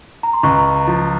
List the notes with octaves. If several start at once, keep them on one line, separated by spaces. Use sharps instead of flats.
A#5
C6
C#2 A#5 C#6
F3